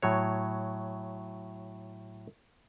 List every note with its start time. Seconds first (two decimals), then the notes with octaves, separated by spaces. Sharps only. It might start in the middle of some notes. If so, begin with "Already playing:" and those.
0.02 A2 F#3 C#5